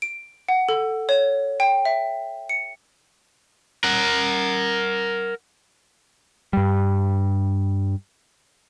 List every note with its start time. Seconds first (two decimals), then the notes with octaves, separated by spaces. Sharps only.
0.02 D7
0.49 F#5
0.69 A4
1.09 C#5
1.60 G5
1.85 E5
2.49 C#7
3.84 A#4 F#5
6.53 G2 G3